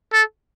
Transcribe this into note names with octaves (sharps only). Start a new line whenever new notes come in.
A4